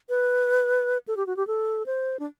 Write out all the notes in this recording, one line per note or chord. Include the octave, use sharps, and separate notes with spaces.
B4
A4
G4
F#4
G4
A4
C5
D4